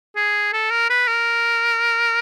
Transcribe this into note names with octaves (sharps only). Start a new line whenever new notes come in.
G#4
A4
A#4
B4
A#4